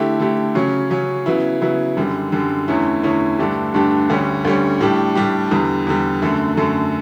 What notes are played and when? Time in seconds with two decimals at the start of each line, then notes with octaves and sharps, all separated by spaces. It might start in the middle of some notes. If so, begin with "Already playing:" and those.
Already playing: D3 A3 E4 G4
0.20 D3 A3 E4 G4
0.55 C#3 F#3 C#4
0.91 C#3 F#3 C#4
1.26 C#3 F#3 B3 E4
1.61 C#3 F#3 B3 E4
1.97 F#2 D3 G3
2.32 F#2 D3 G3
2.68 E2 D3 A3 C#4 E4
3.03 E2 D3 A3 C#4 E4
3.39 G2 D3 A3 D4 G4
3.74 G2 D3 A3 D4 G4
4.10 D2 D3 G3 C#4
4.45 D2 D3 G3 C#4
4.81 A2 G3 D4 G4
5.15 A2 G3 D4 G4
5.51 E2 D3 G3
5.87 E2 D3 G3
6.22 F#2 D3 A3
6.57 F#2 D3 A3